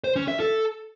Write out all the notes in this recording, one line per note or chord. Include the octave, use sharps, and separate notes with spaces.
C5
C#4
E5
A4